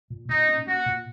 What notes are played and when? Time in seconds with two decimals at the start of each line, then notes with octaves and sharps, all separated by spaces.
0.10 A#2
0.29 A#2 D#4
0.48 C#4
0.67 A#3 F#4
0.86 A#2